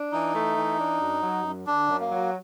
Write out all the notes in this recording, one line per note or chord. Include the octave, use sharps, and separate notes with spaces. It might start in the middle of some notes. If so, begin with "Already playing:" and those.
Already playing: D4
E3 D#4
A3
E3
D4
F#2
F#3
F#2
D3 D4
F#2
A#3
F#3